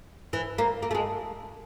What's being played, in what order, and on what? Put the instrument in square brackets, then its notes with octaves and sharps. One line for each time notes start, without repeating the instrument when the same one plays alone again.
[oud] E3
A#3
A#3
A3
G#3